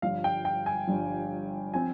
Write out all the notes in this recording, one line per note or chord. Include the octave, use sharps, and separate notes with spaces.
G1 G2 F3 F5
G5
G5
G#5
G1 G2 F3
F3 C4 G#5